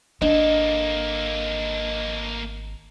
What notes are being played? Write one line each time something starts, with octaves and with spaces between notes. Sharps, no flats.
G#1 A#3 D4 A4 D#5